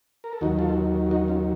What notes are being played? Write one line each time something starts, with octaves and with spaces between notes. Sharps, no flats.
A#4
A4
D#2 D#3 F#3 D#4 F#4
F4 A4
D#4 F#4
C#4 F4